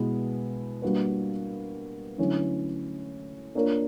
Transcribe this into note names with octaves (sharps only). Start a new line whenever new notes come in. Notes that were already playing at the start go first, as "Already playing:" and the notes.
Already playing: B2 G#3 B3 E4
G3 A#3 D4 F#4 B4
D3 F#3 A3 C#4 E4
A#3 D4 F4 A#4 C#5